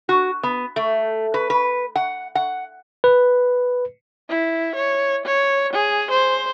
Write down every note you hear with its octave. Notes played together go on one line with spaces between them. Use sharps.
F#4
B3
A3
B4
B4
F#5
F#5
B4
E4
C#5
C#5
G#4
C5